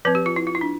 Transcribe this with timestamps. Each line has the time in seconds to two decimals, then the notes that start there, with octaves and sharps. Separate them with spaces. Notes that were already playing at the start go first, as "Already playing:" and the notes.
0.05 F3 C4 B4
0.15 G4
0.26 F4
0.36 E4
0.47 F4
0.55 E4
0.61 D4